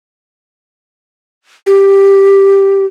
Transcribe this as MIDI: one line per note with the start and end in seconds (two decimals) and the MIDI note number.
1.66 2.85 67